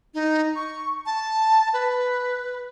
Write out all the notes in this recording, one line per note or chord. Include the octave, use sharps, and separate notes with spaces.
D#4
C#6
A5
B4